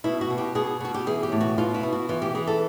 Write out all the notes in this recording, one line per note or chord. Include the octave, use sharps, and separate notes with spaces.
B2 E4
F#4
B2
G4
B2 G#4
B2 F#4
G4
E3 G#4
G4
A2
F#4
B2 F4
E4
B2
F#4
E3 F4
G4
E3 G#4
A4